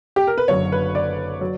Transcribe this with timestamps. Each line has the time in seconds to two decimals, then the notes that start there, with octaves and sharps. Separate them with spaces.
0.16 G4
0.27 A#4
0.38 B4
0.48 F#1 F#2 D3 F#3 C#5
0.72 B4
0.95 D5
1.41 F#3